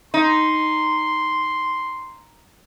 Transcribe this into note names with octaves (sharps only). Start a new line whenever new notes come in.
D#4 C6